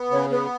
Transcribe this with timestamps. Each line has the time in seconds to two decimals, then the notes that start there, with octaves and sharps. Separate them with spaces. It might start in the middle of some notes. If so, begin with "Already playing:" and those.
Already playing: B3
0.11 C#3 C#5
0.30 B3 B4